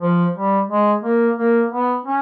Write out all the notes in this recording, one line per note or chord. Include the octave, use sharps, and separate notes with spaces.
F3
G3
G#3
A#3
A#3
B3
C#4